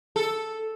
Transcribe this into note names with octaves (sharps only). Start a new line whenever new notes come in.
A4